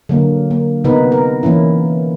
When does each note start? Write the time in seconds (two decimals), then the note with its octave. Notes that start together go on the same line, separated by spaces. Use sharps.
0.09 D3 F#3 A#3
0.51 A#3
0.84 C3 B3 D#4 A#4 B4
1.12 A#4
1.43 E3 A#3 C#4 E4